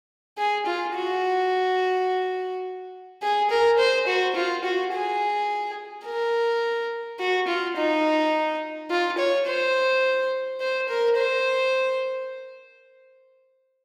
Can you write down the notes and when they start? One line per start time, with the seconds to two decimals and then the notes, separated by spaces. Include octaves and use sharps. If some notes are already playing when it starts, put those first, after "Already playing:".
0.38 G#4
0.66 F4
0.95 F#4
3.22 G#4
3.51 A#4
3.79 C5
4.07 F#4
4.36 F4
4.64 F#4
4.93 G#4
6.05 A#4
7.20 F#4
7.48 F4
7.77 D#4
8.91 F4
9.18 C#5
9.46 C5
10.61 C5
10.89 A#4
11.17 C5